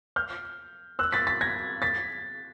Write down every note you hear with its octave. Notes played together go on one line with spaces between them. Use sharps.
F6 G6
E6 F#6
A6 B6
A6 B6
G#6 A#6
A6 B6